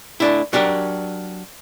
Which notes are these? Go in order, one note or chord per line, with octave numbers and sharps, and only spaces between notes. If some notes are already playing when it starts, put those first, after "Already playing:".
A3 D4 E4
F#3 D4 G4 A#4